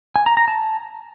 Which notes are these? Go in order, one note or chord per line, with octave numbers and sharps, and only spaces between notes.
G#5
A#5
A#5
A5